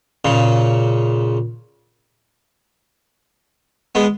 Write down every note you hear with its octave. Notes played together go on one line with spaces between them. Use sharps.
A#2 C#3
G#3 B3